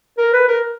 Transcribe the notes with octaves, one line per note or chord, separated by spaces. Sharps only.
A#4
B4
A#4